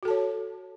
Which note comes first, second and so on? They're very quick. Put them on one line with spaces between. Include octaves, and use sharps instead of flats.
F#4 A4 A5 C#5